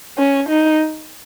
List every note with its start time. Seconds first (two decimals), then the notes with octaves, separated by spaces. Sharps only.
0.18 C#4
0.49 D#4